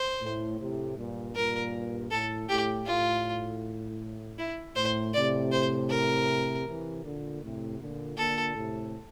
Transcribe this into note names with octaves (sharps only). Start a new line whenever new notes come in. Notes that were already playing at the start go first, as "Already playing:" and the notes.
Already playing: C5
A2
A2 C3
G2 A#2
G2 A#2 A#4
A2 A4
A2 G4
A2 F4
E4
A2 C5
A2 C3 D5
C5
A#4
C3 E3
A#2 D3
A2 C3
A#2 D3
A#2 D3 A4
A2 C3